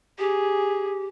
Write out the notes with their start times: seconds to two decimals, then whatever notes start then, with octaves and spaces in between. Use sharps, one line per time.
0.19 G4 G#4